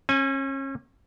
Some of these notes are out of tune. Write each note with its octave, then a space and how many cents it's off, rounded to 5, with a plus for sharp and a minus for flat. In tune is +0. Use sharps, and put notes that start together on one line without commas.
C#4 -35 G#5 +0